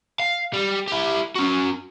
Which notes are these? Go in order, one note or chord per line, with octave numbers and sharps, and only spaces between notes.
F5
G3
E4 G4
C#4 F#4